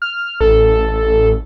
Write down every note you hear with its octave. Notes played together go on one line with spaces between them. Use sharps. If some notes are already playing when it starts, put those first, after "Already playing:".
F6
A1 A4